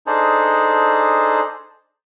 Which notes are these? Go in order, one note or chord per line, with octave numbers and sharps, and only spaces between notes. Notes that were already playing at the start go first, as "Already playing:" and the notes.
D4 D#4 G#4 A4 C5